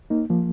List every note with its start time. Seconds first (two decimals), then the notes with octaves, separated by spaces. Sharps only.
0.10 A#3 D#4
0.30 F3 A#3